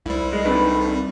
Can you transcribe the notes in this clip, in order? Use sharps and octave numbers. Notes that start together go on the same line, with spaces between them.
C2 G3 E4 C5
G#3
C3 D#3 A3 D4 B4